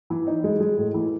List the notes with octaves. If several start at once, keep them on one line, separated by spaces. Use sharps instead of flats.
E3
D#4
G#3
G#3
A2
E3